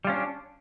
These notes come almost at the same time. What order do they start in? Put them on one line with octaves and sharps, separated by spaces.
G3 F4 C#4 D4